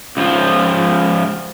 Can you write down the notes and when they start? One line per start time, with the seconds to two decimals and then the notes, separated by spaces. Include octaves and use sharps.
0.17 C#2 F3